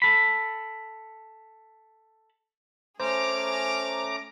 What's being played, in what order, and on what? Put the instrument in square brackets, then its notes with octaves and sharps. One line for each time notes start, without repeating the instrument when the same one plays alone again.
[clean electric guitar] A4 B5
[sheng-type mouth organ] A3 C#4 [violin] G#4 F6 [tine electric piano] C5 [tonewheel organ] A#5 D6